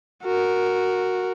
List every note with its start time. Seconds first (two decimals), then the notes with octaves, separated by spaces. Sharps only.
0.23 F#4 A#4